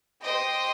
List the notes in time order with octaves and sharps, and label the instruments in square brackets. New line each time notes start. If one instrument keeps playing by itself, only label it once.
[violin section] G4 C5 D#5 G5